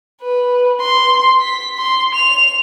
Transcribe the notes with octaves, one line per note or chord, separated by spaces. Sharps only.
B4
C6
B6
C6
F7